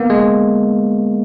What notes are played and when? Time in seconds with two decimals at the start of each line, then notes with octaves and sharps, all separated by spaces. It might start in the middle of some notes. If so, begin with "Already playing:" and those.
Already playing: A#3 B3
0.10 G#3